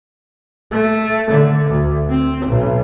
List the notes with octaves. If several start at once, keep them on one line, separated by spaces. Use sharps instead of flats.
A3
D3
D2
C4
B1